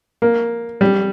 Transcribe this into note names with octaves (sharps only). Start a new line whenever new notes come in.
A#3
G3